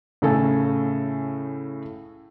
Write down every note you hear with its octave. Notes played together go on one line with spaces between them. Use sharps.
A2 C#3 A4 G#5